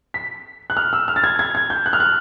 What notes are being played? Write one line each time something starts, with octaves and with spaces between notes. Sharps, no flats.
B6
F#6
F6
E6
F6
A6
G#6
G#6
G#6
G6
F#6
F6
F#6